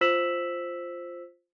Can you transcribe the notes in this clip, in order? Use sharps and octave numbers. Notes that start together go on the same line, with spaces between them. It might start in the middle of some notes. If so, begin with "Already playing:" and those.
F4 C5 E6 B6 E7 F#7